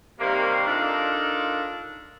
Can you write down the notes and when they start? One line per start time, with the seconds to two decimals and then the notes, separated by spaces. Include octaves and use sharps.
0.20 C3 D#3 G3 A#3
0.67 D4 D#4 F4 A4 A#4